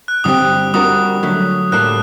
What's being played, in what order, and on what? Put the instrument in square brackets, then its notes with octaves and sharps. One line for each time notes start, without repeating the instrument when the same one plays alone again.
[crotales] F#6
[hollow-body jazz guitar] G2 D3 G3 C4 G4 [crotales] D#6
[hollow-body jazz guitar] G3 D4 F#4 A#4 [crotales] D#6
[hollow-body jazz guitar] D3 F#3 A3
[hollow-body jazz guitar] A2 G3 A#3 D4 A4 [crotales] F#6